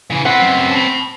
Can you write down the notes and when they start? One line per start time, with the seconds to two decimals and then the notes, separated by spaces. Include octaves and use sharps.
0.10 C#3 E3
0.25 B3 C4 B4 F#5
0.41 F#2
0.71 A5 B5